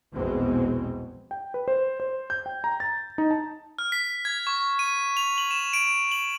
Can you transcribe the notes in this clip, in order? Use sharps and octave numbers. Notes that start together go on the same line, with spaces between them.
A#1 E2 B2 G#3 C4
G5
B4
C5
C5
G6
G5
A#5
A6
D#4
A5
F6
B6
G#6
C#6
D#7
F7
F#7
E7
D7
F#7